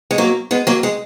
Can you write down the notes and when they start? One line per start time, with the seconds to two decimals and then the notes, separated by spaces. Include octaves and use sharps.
0.11 G#3
0.18 F#3 A#3
0.51 G#3 B3
0.67 F#3 A#3
0.83 G#3